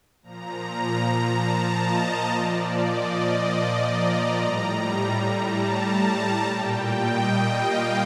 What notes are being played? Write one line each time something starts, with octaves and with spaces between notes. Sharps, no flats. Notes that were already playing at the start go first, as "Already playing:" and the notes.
A#2 F3 A#5
A5
D#5
A#2 F3 D5
D#5
A#5
A2 G3
A5
A#2 G3 G5
D#5
F5